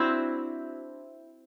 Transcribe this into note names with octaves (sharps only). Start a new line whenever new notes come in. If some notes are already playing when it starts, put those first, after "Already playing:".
Already playing: C4 D4 E4 F#4